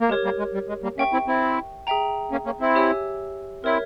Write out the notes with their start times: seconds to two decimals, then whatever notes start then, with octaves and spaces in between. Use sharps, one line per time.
0.01 A#3
0.09 G#3 G4 A#4 C#5
0.24 G3 A#3
0.39 G#3
0.54 G3
0.69 G#3
0.83 G3 A#3
0.98 A#3 C#4 E5 G5 C#6
1.13 C4 E4
1.27 C4 E4
1.87 G#4 E5 G5 A#5
2.32 A#3 C#4
2.46 A#3 C#4
2.60 C4 E4
2.75 G4 C#5 E5 G#5 E6
3.64 C4 E4 A#4 C#5 E5